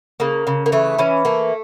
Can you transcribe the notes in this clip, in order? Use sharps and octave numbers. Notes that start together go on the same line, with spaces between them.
C#3 A#3
C#3
A#3
E3 A3
E3 C#4
A3 A#3